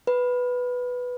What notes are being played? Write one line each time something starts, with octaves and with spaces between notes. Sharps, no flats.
B4